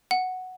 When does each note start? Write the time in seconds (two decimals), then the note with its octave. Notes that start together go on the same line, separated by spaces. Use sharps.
0.11 F#5